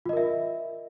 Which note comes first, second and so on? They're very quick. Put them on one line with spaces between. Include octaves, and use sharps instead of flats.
F4 D#5 A#4 E5